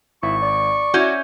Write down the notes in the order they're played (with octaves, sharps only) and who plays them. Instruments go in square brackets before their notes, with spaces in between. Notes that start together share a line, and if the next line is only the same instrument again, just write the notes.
[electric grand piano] G#1 [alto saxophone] E4 [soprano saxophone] C#6
[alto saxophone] D5
[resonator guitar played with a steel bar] C#4 E4 [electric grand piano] F#4 G6